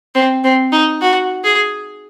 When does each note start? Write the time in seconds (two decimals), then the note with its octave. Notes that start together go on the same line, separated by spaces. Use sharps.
0.15 C4
0.44 C4
0.72 D#4
1.02 F#4
1.44 G#4